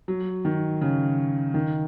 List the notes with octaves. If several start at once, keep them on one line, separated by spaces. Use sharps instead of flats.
F#3
D#3
C#3
D#3